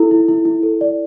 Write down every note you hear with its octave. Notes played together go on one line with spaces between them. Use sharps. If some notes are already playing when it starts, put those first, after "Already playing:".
Already playing: E4 A4
E4
E4
E4
A4
D5